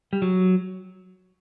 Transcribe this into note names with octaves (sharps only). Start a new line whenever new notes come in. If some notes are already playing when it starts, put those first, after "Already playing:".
G3
F#3